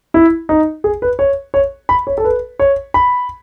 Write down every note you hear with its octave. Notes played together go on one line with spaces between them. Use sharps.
E4
D#4
G#4
B4
C#5
C#5
B5
C#5
A4
B4
C#5
B5